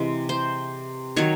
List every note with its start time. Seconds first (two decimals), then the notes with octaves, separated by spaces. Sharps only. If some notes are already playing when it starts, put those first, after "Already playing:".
Already playing: C3 E3 G#3
0.29 C5
1.16 D#3 F#3 C#5